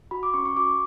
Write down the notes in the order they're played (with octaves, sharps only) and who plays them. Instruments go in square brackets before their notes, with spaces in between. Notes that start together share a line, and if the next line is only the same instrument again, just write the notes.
[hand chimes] F#4 B5
D6
C#4 C#6
C#6
F#4 D6